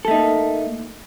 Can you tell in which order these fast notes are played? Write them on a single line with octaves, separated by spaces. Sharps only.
A4 A3 D#4 A#3